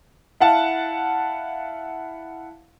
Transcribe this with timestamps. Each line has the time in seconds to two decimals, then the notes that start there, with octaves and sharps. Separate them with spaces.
0.40 E4 F5 F#5 A5